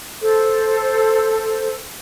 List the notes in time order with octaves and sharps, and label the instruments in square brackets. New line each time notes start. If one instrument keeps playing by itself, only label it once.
[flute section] A4 C5